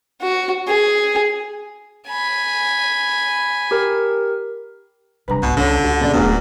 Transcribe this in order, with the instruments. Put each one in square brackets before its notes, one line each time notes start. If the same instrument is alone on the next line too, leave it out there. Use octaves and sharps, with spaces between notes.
[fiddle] F#4
G#4
G#5 B5
[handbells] G4 A#4
[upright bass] C3 G3 [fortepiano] B4 A#5
[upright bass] C2 G#2 [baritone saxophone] B2
[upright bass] C#2 [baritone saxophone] D3 [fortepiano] C#4
[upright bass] C#2 [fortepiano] F#4
[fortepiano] A#1 C#3 D5
[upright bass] D1 A3 [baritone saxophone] A#2 [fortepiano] B3 F#4 G#4